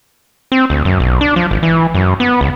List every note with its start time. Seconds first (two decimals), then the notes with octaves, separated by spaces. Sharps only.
0.52 C4
0.70 D2
0.85 F#2
1.00 B1
1.21 D4
1.36 F3
1.51 G#1
1.63 E3
1.95 F#2
2.20 B3
2.41 C#2